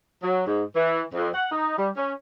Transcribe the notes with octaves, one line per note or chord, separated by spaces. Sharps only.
F#3
G#2
E3
F2
F#5
D#4
G3
C#4